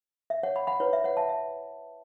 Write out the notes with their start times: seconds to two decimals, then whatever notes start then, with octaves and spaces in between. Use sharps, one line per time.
0.30 E5
0.43 C#5 F#5
0.56 F#5 B5
0.67 F#5 B5
0.80 E4 B4 C#5
0.93 E5
1.04 C#5 F#5
1.17 E5 A5
1.29 E5